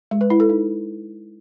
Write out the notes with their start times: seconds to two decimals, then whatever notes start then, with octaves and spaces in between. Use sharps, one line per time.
0.11 G#3
0.21 B4
0.30 E4
0.40 A4
0.49 D#4